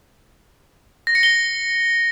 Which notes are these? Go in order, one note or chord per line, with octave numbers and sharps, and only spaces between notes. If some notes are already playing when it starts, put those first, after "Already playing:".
A#6
C#7
G7